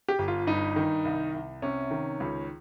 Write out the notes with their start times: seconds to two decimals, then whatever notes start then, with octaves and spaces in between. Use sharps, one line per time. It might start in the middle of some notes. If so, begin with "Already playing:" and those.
0.08 G4
0.19 G1
0.28 F4
0.47 G2 D#4
0.76 D#3
1.05 C2
1.34 C2
1.62 C3 C#4
1.91 D#3
2.20 C#2